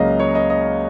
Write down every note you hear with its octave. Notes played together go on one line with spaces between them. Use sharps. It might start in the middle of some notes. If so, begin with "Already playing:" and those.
Already playing: C#2 C#3 F#3 A#3 C#4 D#5 F5
C#5
D#5
D#5